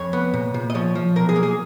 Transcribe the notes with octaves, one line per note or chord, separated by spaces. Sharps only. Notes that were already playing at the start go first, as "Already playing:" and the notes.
Already playing: F2 C#5
B3
A#2
A#2
D#5
F3 C#5
F3
B1 A#4
G#4
A#3
G#4